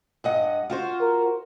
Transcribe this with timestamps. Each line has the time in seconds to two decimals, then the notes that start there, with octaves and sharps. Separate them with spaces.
0.24 G2 D#5 F#5
0.70 F4 F#4 C5
1.00 A#4